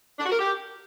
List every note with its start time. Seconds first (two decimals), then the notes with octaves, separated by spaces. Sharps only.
0.19 D4
0.26 F#4
0.32 A#4
0.38 G4